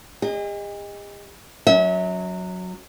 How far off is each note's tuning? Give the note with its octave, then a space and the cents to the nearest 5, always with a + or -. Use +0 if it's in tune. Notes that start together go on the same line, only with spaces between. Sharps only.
G#4 -45 D#5 +0
F#3 -15 C#4 +20 E5 -35